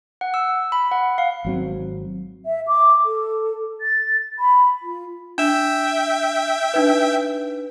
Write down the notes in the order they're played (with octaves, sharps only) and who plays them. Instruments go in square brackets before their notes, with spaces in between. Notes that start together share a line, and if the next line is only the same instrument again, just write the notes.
[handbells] F#5
E6
B5
F#5
F5
[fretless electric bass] G#1 F#3 C4
[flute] E5
D6
A4
A6
B5
F4
[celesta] D4 E7 [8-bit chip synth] E5 G5
[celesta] D4 D#4 B4